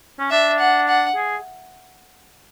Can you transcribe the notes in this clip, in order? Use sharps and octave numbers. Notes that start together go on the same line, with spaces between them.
C#4
D4 E5
F#5
F#5
G#4